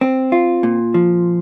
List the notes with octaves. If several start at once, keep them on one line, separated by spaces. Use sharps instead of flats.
C4
F4
A#2
F3